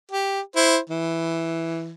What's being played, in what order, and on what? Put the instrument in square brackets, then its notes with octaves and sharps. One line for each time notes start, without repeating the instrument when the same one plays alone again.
[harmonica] G4
E4 C5
E3